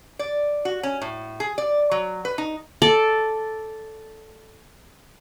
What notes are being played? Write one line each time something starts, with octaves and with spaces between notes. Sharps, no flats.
D5
F#4
C#4
A2
G#4
D5
F#3
B4
D#4
A4 D5